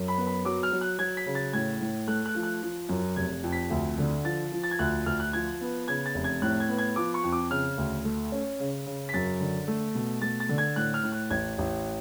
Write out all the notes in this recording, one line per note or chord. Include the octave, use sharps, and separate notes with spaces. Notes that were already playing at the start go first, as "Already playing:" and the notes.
Already playing: F#2
B5
B3
B5
F#3 D6
F6
F#3
F#6
F#3 G#6
B6
C#3
A6
A2 G#6
A2
A3 F#6
F#6
F3
F#6
F3
F#2
F1 G#6
F2
B6
D2
D3
F3 A6
F3
A6
G#6
D2 F#6
D2 F6
F#6
F3 G#6
B3
C#3 G#6
A6
F1
G#6
A2 F#6
G#6
B3
G#6
F3 D6
C#6
F2
D6
C#3 F6
D2
A3
C#4
C#3
C#3
B6
F#2 A6
D3
A3
B2
A3 A6
A6
D3
G#6
A2 F#6
F6
A2
F#6
A1 G#6
A1